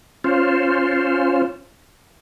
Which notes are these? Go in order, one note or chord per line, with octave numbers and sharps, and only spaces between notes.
C#4 F4 C5